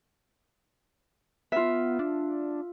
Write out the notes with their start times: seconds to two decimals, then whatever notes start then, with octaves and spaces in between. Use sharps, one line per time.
1.52 B3 F4 E5
1.99 D4